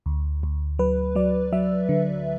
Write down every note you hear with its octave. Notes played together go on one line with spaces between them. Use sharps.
D2
D2
F#3 B4
F#3 D5
F#3 E5
D3